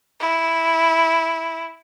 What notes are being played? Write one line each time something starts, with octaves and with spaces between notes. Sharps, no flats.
E4